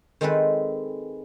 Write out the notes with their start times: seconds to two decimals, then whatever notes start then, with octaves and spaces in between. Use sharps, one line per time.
0.21 D#3 G#3 C4 D#4 A4 B4